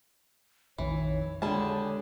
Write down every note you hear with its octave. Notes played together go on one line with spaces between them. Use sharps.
A#1 F2 D#3 E3 C#5
D3 G3 G#3 G#4 A5